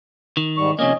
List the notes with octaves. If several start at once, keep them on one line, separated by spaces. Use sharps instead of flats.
D#3
G#2 G3 C#6
C3 F3 A#3 C#4 D#5